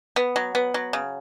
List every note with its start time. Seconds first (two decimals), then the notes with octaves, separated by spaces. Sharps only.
0.16 B3
0.36 F#3
0.55 B3
0.74 F#3
0.93 C#3